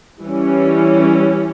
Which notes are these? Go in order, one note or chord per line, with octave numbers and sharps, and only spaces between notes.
E3 G3 C#4